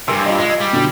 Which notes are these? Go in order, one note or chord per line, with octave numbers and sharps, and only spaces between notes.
G2 C3 A#4 G#5 E6
F4 D#5
G#3
G3
B2 D3